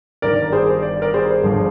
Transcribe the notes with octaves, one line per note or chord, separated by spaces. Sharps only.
G1 G2 D#3 A#4 D5
G#4 C5
D5
A#4 D5
G#4 C5
G1 G2 D3 F3